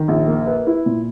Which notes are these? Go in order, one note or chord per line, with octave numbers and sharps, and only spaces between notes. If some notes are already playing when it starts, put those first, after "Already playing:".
Already playing: D#3
A#1
A#3
B4
E4
A#2